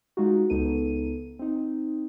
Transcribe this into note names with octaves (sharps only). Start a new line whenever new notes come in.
G#3 D#4 F4 F#4
C#2 B3 D#4 A4 D#7
C4 D#4